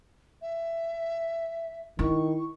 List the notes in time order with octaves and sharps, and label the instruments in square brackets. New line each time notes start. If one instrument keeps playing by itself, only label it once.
[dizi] E5
[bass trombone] D#3 [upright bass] E4 [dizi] C#6